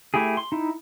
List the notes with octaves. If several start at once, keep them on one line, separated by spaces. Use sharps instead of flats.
A3 E4 G4 G#4
C6
D#4 E4